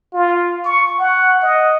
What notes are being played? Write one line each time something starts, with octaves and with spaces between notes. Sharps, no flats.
F4
C#6
F#5
D#5